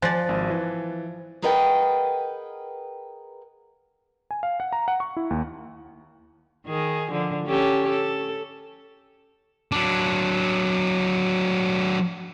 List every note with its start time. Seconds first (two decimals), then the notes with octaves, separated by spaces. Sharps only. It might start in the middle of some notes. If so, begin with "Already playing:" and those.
0.02 F3 D5 G#5 F#6 A6
0.29 G#1
0.50 E3
1.42 G#4 A#4 B4 D#5 F#5 G5
4.31 G#5
4.43 F5
4.60 F#5
4.73 A#5
4.88 F#5
5.00 C#6
5.17 E4
5.30 D#2
6.66 D#3 G#4
7.12 D3 F3
7.46 C#4 G4 A4
7.89 A4
9.72 F#3 D4